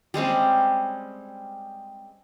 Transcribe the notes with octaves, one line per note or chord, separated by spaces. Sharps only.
G3 G#3 C4 C#4